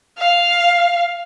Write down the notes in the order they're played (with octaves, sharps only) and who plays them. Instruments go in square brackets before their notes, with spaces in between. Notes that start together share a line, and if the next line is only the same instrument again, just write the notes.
[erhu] F5